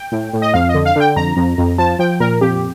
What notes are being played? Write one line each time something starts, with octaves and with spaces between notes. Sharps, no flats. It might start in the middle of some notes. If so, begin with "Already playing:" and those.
Already playing: G5
A2
A2
D#5
F2 F5
D#5
D3
F5
D3 G5
F2 A#5
F2
F2
F3 A5
F3 G5
A#2 A#4
F2 G4